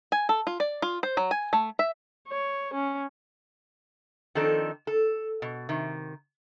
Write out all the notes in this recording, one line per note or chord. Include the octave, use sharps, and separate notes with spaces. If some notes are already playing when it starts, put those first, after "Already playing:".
G#5
A4
F4
D5
F4
C5
F#3
G#5
A3
E5
C#5
C#4
D#3 F3 C4 D4 D#4 A4
A4
B2
C3 D#3